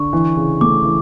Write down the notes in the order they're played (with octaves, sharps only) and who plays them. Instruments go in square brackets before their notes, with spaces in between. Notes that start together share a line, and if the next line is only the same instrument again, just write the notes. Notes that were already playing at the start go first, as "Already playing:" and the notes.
Already playing: [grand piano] D3 [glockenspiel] C#6
[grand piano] E3
C#3
[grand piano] A3 [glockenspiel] D6
[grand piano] E3